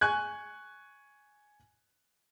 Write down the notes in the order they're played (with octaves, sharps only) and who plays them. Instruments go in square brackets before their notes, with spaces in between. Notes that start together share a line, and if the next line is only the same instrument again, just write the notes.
[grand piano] G#5 C#6 F#6 G#6